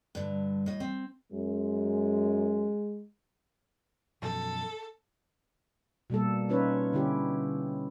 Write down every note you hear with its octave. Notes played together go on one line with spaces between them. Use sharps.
G2 D3
A2 D#5
C4
F#2 G#3
F#2 B2 F3 A4
B2 G3 A#3 A4
C#4 D#4 F4 B4 C#5
D3 C#4 E4 G4